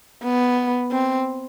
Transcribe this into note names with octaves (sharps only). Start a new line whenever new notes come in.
B3
C4